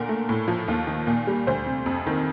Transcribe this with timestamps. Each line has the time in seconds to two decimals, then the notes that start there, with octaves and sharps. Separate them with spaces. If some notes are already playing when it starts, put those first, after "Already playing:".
Already playing: A#2 D3 A#4
0.09 A3
0.29 A2
0.48 F3
0.68 D#2
0.87 D#3
1.07 A#2
1.27 G3
1.47 D2 C5
1.66 C3
1.86 F2
2.07 D#3